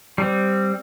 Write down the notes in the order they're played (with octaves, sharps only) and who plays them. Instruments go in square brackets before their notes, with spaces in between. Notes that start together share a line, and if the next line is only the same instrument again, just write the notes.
[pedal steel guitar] G3 C4